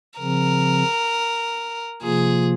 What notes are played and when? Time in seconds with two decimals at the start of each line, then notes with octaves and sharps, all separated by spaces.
0.19 C#3 F3 C4 A#4
2.02 C3 F3 A#3 F4 G#4